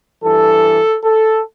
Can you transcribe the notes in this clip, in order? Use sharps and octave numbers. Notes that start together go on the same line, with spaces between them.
G2 E3 A4
A4